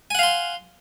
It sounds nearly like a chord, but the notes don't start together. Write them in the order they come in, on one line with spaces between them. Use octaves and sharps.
G#5 F#5 F5 C6